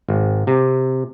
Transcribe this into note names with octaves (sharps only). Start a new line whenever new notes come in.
G#1
C3